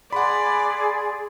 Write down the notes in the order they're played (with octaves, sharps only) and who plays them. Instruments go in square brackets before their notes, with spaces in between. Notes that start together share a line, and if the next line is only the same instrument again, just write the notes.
[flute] G#4 [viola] D5 [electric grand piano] F#5 B5 [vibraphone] C6